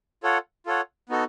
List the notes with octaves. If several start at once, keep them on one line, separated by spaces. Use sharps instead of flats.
F4 A4 C#5 F#5
F4 A4 C#5 F#5
B3 D#4 F#4 A4